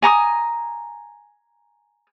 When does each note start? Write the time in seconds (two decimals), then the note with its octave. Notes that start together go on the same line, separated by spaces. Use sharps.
0.02 G#5 A#5 C#6 D#6